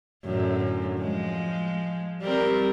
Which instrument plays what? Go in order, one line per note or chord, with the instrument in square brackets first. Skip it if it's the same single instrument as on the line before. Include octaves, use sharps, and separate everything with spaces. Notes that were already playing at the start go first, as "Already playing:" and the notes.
[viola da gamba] F#2 A2 D3
F3 G#3
G3 C4 A#4